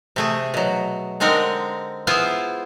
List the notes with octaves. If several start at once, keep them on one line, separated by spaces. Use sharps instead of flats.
C3 A3 G#4
B2 F#3
D3 G#3 C4 D#4 A#4 F#5
B3 E4 F4 G#4 C5